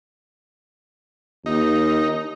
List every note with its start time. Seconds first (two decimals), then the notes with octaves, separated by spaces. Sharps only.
1.46 D#2 D#4